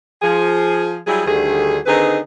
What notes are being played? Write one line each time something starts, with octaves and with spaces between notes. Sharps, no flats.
F3 G#4
F#3 G3 E4 G#4
D2 D3 D#3 G3 G#4
D3 D#3 C4 D#4 G#4 B4